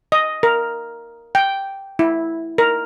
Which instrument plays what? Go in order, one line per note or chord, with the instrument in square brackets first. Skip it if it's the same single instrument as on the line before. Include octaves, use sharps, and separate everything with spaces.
[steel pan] D#5
A#4
G5
E4
A#4